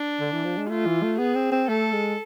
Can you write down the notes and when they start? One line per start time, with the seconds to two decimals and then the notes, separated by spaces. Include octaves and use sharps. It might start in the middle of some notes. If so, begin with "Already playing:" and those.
Already playing: D4
0.20 D3
0.32 E3
0.45 F3
0.58 G#3
0.69 A3 F4
0.86 E3
1.03 A3
1.19 B3 G#4
1.35 C4
1.51 C4
1.68 A3 A4
1.93 G#3